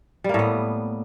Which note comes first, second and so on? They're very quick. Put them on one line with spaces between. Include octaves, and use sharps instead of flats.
G3 A#3 A2 B3